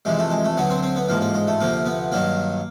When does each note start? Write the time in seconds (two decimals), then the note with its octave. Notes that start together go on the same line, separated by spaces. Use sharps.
0.05 F2 C3 E3 G#3
0.19 A3
0.31 G#3
0.45 A3
0.57 D2 D3 F#3 B3
0.70 C4
0.83 C4
0.96 B3
1.09 A1 G#2 F3 A#3
1.21 A#3
1.35 G#3
1.47 A3
1.61 D2 C3 F3 A#3
1.85 B3
2.12 G2 D#3 F#3 A#3